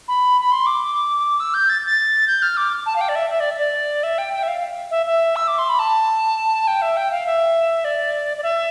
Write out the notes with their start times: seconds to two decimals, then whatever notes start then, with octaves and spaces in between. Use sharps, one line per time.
0.08 B5
0.41 B5
0.52 C6
0.66 D6
1.40 E6
1.54 G6
1.69 A6
1.86 A6
2.27 G6
2.42 F6
2.57 D6
2.86 A5
2.96 F5
3.01 G5
3.09 D5
3.16 E5
3.30 E5
3.40 D5
3.58 D5
4.03 E5
4.18 G5
4.33 G5
4.43 E5
4.48 F5
4.91 E5
5.06 E5
5.36 E6
5.48 D6
5.58 C6
5.69 B5
5.79 A5
6.67 G5
6.82 E5
6.97 G5
7.11 F5
7.26 E5
7.85 D5
8.38 D5
8.43 E5